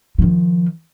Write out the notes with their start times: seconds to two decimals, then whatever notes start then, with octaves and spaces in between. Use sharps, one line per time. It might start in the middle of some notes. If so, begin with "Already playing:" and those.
0.18 D#3 F3